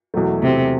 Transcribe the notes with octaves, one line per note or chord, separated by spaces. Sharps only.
E1 E2 B2 F#3 A3
C3